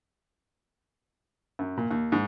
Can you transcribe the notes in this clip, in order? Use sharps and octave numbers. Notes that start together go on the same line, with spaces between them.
F#2
A#2
D#2
G#2